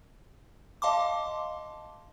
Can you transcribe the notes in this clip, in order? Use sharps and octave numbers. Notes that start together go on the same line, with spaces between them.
D#5 F5 A5 C6 D6